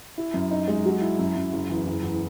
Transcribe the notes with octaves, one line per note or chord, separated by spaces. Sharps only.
E4
F#2
D#4
G#3
F#3
E4
F#2
F#2
F#1
E2
F#1
E2